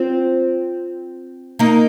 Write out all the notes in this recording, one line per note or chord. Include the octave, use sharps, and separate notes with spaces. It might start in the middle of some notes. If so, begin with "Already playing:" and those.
Already playing: C4 F4
A#3 D#4